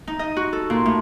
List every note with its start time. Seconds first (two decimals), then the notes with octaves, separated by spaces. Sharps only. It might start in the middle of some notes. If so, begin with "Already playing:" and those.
0.07 D#4
0.19 D#5
0.37 F#4
0.53 A4
0.70 A#2
0.86 A2